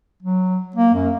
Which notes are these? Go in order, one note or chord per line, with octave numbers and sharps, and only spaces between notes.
F#3
A#3
F#2